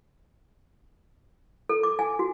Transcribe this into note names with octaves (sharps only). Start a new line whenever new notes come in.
A4
D6
G#5
F#4